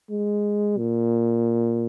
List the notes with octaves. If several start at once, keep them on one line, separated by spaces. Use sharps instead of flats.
G#3
A#2